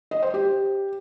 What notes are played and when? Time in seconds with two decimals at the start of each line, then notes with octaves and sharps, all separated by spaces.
0.11 D#5
0.23 C5
0.34 G4